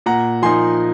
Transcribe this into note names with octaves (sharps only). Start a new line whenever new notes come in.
A#2 F#5 A#5
F3 A#3 D#4 G#5 C6